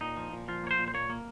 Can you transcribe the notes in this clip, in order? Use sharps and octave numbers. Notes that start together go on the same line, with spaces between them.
A#2 D#4
F3
A#2
F3 F4
A#3 C#5
C5
A#2
C5
A#3 C#5
A#3